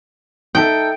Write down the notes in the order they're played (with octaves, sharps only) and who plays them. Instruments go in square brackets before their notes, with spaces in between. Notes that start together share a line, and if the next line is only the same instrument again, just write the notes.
[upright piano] D#4 A4 E5 [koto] G5